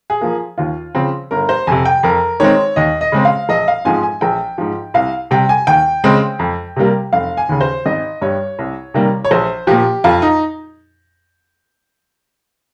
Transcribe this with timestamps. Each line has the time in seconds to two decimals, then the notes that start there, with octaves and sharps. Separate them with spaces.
0.10 G#4
0.21 F3 A#3
0.58 D#2 F4
0.95 C#3 F3 C4
1.31 G1 A#4
1.49 C5
1.67 F2 C3 G#5
1.85 G5
2.03 F2 A#4
2.40 D#3 G#3 C4 C#5
2.76 D#2 D#5
3.01 D#5
3.12 C#3 G#3 C4
3.25 F5
3.49 A#1 D#5
3.68 F5
3.85 G#2 F3 G#3 C4 G#5
4.03 G#5
4.21 A#1 G5
4.58 G#2 F3
4.94 C2 F5
5.31 C3 G3 G5
5.49 G#5
5.67 D#2 G5
6.04 C#3 G#3 C4
6.39 F2
6.76 C3 G3 A#3
7.13 F1 F5
7.37 G#5
7.49 D#2 C#3
7.61 C5
7.86 G#1 D#5
8.21 G2 G3 C#5
8.59 C2
8.94 C3 D#3 G3 A#3
9.25 C#5
9.31 A#1 C5
9.67 A#2 F3 G4
10.04 F2 F4
10.22 D#4